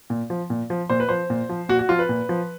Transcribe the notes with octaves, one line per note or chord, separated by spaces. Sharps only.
A#2
F3
A#2
F3
A#2 C5
B4
F3 C5
A#2
F3
A#2 F#4
F#4
F3 F4
B4
A#2
F3